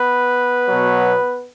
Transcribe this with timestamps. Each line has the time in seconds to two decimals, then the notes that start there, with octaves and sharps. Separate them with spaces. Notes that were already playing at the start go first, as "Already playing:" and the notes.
Already playing: B3 B4
0.68 B2 F#3